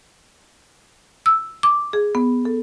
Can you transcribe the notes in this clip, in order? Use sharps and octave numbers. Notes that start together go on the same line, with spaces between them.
E6
D6
G#4
B3
A4